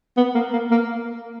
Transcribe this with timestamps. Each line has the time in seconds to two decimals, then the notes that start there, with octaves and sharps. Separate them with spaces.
0.17 B3
0.35 A#3
0.53 A#3
0.71 A#3